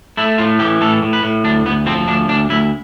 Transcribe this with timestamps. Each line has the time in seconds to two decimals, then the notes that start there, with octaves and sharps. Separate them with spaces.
0.17 A3 E4
0.38 A2 F4
0.59 E3 G4
0.81 A2 A4
1.02 A2
1.13 B4
1.23 A2
1.44 D2 D4
1.66 D2 B3
1.86 F3 C4
2.08 D2 D4
2.28 D2 D4
2.50 D2 E4